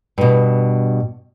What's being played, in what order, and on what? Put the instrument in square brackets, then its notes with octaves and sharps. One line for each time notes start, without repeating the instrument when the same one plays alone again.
[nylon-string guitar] G2 B2